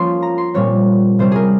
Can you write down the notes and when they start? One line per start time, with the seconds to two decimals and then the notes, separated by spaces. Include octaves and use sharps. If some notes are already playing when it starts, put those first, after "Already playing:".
Already playing: F3 A#3 C#4 C6
0.23 A#5
0.38 C6
0.54 A#2 G3 C4 C#5
1.19 C3 G3 C#4 C5
1.32 G#4 A#4